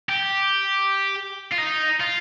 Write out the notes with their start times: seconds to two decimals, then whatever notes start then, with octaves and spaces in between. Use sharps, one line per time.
0.09 G4
1.52 F4
1.58 D#4
2.00 F4